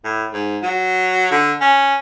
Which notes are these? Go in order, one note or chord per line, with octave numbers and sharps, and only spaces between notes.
A2
G#2
F#3
D3
C#4